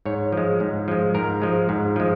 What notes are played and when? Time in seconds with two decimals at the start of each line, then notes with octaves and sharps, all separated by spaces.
0.06 G#2 C#5
0.32 F3 G#3
0.60 G#2
0.88 F3 G#3
1.14 G#2 A#4
1.42 F3 G#3
1.69 G#2
1.96 F3 G#3